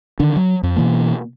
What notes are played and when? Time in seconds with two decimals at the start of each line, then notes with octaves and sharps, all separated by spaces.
0.19 D3 D#3 D4
0.36 F#3
0.63 F2
0.76 B2 E3 A#3